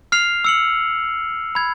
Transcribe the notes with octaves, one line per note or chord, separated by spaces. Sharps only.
F6 C7 F7
E6 C#7 F#7
B5 G#6